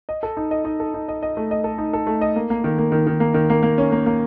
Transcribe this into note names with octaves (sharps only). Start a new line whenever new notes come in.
D#5
A4
D#4
D#5
D#4
A4
D#4
D#5
D#5
A3
D#5
A4
D#4
A4
A3
D#5
A#3
A#3
D#3
A#3
D#3
D#3
A#3
D#3
A#3
A#3
C#4
A#3
A#3